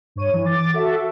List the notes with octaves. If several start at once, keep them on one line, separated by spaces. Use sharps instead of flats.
G2 C#5 D#7
E3
D6 A6
F#4 A4 E5